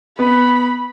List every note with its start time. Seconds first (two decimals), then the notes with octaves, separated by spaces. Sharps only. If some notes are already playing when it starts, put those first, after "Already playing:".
0.19 B3 B4 B5